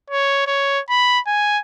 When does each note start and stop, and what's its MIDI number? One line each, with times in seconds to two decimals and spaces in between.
0.10 0.43 73
0.47 0.80 73
0.89 1.19 83
1.27 1.59 80